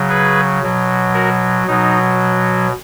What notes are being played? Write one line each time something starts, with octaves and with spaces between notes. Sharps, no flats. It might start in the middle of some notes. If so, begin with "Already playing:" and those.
Already playing: C#3 F#3
G#4 B4
B2 F#3
F#4 A#4
B2 F#3 D#4